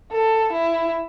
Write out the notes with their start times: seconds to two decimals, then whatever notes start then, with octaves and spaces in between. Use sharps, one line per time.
0.11 A4
0.53 E4